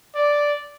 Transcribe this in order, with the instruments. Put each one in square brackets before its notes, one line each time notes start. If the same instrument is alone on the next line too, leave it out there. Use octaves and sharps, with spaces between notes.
[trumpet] D5